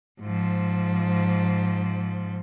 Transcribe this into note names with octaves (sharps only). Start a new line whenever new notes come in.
G#2 F3